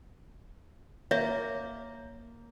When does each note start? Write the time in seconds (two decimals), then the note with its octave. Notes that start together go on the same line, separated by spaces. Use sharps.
1.11 A#3 C#5 E5